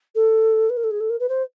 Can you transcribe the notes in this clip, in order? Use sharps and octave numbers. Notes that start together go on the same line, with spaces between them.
A4
B4
A#4
A4
G#4
A4
A#4
B4
C5